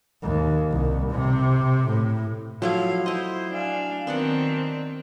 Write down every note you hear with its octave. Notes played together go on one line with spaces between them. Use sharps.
D#2
C2
C3
A2
F3 F#3 A3 E4 F5
E4 C5 D#5
D4 F5 G#5
D#3 B3 C4 D4 D5 F#5